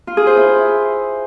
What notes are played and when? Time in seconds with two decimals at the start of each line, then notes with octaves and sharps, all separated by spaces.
0.07 F4
0.17 G#4
0.27 C5
0.37 E4